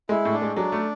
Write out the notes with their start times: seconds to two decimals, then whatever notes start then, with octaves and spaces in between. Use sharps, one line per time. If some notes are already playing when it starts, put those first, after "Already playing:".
0.09 G#3 E4
0.25 A2
0.33 D4
0.42 G#3
0.56 F#3 D4
0.72 A3